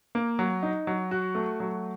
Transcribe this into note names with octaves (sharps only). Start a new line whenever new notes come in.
A#3
F#3
D#4
F#3
F#4
A3
F#3